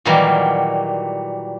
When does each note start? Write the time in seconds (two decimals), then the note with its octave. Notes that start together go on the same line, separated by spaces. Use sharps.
0.05 A#2 D#3 E3 F#3 G3 A#3